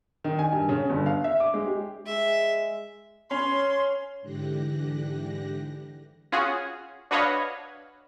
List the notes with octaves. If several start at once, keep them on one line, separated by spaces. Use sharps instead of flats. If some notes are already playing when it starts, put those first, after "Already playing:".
D#3
G#5
G2
C#3
G1
F5
E5
D6
G#3
G4
G#3 E5
C#4 B4 C#5 B5 C6
G#2 D3 E3 G4 F#6 A#6
C#4 F4 F#4 G#4
D4 F#4 B4 C#5 D#5 F5